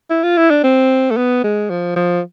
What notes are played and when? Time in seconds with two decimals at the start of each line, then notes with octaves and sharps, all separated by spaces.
0.10 E4
0.24 F4
0.37 E4
0.51 D4
0.64 C4
1.11 A3
1.17 B3
1.44 G#3
1.70 F3
1.96 F3